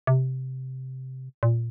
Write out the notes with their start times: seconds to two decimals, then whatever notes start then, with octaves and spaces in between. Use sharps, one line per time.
0.07 C3
1.43 A#2